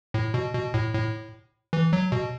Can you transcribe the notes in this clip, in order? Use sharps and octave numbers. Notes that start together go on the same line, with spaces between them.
A2
B2
B2
A2
A2
E3
F#3
B2